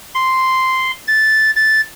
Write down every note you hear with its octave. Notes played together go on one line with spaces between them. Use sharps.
C6
A6
A6